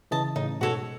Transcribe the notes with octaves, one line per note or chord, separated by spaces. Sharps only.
C#3 E3 D#5 A5
A2 C#3 D#4
G#2 B2 F#4 A4 C#5